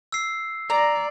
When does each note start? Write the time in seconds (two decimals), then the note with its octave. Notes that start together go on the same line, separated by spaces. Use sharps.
0.12 E6 C7
0.70 D5 A#5